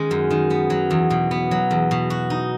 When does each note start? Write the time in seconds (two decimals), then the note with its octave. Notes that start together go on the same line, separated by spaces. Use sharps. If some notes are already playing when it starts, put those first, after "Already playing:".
Already playing: D#3 G#3 C#4
0.11 F#2
0.30 D#3
0.50 B3
0.70 F#3
0.91 E2
1.10 B2
1.31 B3
1.51 F#3
1.71 E2
1.91 B2
2.10 F#4
2.30 D#4